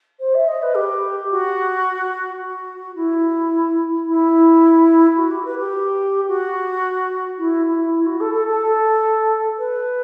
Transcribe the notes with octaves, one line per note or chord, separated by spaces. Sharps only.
C5
E5
D#5
B4
G4
F#4
F#4
E4
E4
F#4
G4
B4
G4
F#4
E4
E4
E4
F#4
A4
A4
A4
B4